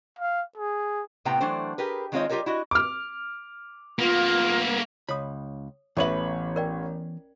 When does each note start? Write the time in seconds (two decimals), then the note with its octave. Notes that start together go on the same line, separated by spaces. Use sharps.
0.19 F5
0.58 G#4
1.25 A2 C3 B3 C4 G5 A#5
1.40 E3 F#3 A3 D4 C5
1.78 G4 G#4 A#4 B4
2.12 D#3 G#3 C4 F4 C#5 D#5
2.29 G3 F4 G4 A4 A#4 C#5
2.46 E4 F#4 D#5
2.71 D6 F6
3.99 A#3 B3 F4
5.09 C#2 C#5 B5 D#6
5.97 A1 E3 B3 A4 B4 C#5 E5 F#7
6.56 A#4 D5 G5